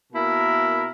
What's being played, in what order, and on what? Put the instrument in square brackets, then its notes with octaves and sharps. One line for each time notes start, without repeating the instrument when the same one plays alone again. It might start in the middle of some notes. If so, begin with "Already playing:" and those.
[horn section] B2 A#3 E4 A#4